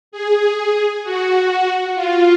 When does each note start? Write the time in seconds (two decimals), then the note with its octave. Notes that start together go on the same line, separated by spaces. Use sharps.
0.12 G#4
1.04 F#4
1.95 F4